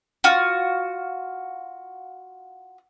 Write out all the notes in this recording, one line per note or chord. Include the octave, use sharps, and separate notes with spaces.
F4 F#4